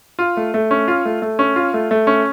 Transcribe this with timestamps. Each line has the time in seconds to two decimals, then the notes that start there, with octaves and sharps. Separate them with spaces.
0.19 F4
0.37 A3
0.54 A3
0.71 C#4
0.88 F4
1.05 A3
1.22 A3
1.39 C#4
1.56 F4
1.74 A3
1.91 A3
2.07 C#4